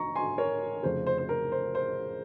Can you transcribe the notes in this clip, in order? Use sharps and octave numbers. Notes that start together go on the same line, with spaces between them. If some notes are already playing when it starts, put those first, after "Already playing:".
Already playing: F1 D#3 A#5 C#6
G#5 C6
A#4 C#5
F1 F2 C#3 C5
C5
C5
A#4
C5
C5